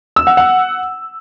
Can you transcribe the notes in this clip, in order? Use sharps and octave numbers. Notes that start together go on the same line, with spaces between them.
E6
F#5
F#5